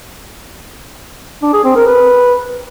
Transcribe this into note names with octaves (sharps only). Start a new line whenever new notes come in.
D4
G#4
C4
A#4
B4